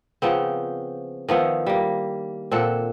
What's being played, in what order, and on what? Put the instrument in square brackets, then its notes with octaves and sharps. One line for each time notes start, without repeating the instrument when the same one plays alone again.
[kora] C#3 F3 B3 C4
D#3 F3 B3 E4
G3 A#3
A#2 C4 A4 F#5